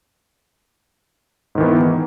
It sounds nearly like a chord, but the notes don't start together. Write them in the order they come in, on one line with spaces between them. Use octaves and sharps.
G#2 D#3 E3 B3